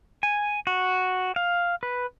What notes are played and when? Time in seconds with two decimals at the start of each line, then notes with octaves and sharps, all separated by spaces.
0.23 G#5
0.67 F#4
1.36 F5
1.83 B4